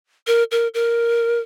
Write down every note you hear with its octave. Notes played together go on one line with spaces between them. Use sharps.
A#4
A#4
A#4